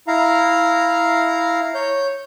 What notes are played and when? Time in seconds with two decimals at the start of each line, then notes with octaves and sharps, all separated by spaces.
0.08 E4 F5 A#5
1.74 C#5 G6